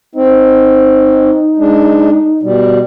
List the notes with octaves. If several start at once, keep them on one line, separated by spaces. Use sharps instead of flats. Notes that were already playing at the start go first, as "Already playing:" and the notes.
C4 D#4
G#3 D4
B2 G3